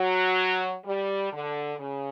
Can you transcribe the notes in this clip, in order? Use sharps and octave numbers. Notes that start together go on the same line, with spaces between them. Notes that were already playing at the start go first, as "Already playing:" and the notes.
Already playing: F#3
G3
D3
C#3